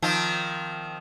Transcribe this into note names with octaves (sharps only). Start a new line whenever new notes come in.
D#3 F3 C4